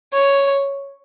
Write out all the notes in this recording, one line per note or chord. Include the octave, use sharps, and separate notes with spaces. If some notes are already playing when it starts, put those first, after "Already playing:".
C#5